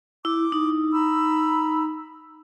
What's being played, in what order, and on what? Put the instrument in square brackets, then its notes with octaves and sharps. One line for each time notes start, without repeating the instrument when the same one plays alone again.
[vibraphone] E4 [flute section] D6
[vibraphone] D#4
[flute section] A#5 B5 E6